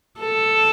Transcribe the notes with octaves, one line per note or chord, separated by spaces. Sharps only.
A4